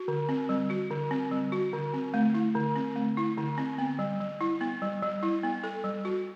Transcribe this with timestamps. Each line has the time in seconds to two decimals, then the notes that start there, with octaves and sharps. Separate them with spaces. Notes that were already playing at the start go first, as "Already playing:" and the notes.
Already playing: F#4
0.08 D3
0.29 C4
0.49 G3
0.70 F#4
0.91 D3
1.11 C4
1.31 G3
1.52 F#4
1.73 D3
1.94 C4
2.14 A3
2.34 E4
2.55 D3
2.76 C4
2.96 A3
3.17 E4
3.38 D3
3.58 C4
3.78 B3
3.99 G3
4.20 G3
4.41 E4
4.61 B3
4.82 G3
5.02 G3
5.23 E4
5.43 B3
5.64 A4
5.84 G3
6.05 F#4